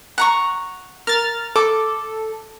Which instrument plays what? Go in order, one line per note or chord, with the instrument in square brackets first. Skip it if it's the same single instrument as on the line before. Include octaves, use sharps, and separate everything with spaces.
[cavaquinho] F#5 A#5 C#6
[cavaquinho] A#4 [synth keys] F6 A6
[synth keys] A4 [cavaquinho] D6